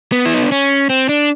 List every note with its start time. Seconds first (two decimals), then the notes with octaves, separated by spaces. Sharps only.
0.12 B3
0.26 E4
0.34 D#4
0.43 D4
0.52 C#4
0.90 C4
1.09 D4